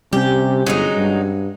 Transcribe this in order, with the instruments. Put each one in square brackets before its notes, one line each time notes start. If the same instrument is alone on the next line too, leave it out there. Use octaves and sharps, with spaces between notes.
[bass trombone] C3 [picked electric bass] G3 C#4 [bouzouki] G4
[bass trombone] G1 [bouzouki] F#3 G#3 D#4
[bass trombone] G2